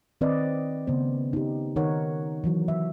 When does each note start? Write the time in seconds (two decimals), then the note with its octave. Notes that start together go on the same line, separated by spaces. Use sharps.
0.21 D#3 C4 B4 D5 D#5
0.87 C#3 A3 B3 C5
1.33 D#4 G4
1.76 D#3 D#4 A#4 C#5 F#5
2.44 E3 F#3 F#4
2.68 E5